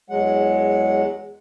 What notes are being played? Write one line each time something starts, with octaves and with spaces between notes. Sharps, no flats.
E2 F#3 G#3 F#5